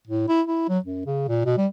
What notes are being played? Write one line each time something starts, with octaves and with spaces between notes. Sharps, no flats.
A2
E4
E4
F#3
F#2
C#3
A#2
B2
G3